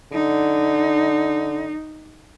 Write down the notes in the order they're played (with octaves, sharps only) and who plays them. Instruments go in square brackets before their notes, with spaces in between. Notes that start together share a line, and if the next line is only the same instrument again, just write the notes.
[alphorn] D3 [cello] D#4